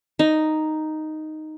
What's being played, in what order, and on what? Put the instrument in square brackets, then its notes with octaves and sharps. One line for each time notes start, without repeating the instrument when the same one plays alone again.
[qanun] D#4